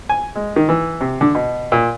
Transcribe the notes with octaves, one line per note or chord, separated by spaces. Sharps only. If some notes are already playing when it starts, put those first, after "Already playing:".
G#5
G#3
D#3
E3
C3
D3
B2
A#2